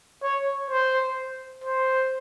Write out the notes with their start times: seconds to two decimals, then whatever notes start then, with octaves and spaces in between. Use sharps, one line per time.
0.22 C#5
0.70 C5
1.64 C5